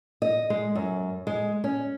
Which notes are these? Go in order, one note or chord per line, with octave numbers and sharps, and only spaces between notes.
D#5
G#3
F#2
G#3
C#4